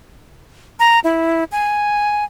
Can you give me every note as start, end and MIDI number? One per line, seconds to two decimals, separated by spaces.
0.79 1.00 82
1.04 1.44 64
1.52 2.24 80